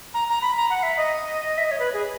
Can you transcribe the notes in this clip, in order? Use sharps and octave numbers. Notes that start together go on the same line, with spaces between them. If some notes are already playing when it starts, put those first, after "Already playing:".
A#5
A#5
B5
A#5
F#5
E5
D#5
E5
D#5
C#5
B4
G#4